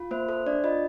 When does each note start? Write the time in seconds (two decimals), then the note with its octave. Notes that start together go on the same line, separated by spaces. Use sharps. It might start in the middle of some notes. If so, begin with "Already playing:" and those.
Already playing: F4
0.11 A#3 C5
0.29 A4 C5
0.46 D4 D5
0.64 F4 D#5